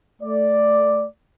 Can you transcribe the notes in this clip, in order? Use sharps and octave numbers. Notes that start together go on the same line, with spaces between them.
A3 D5